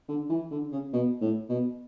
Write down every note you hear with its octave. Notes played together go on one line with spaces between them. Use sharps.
D3
E3
D3
C#3
B2
A2
B2